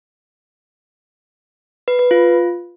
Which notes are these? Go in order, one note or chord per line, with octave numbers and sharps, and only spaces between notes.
B4
B4
F4